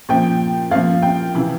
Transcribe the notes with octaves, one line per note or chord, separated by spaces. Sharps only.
A#2 F3 G5
A#2 F3 F5
G5
C3 E3